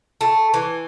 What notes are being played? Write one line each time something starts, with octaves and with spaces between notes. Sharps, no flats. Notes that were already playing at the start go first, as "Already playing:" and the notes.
A3
E3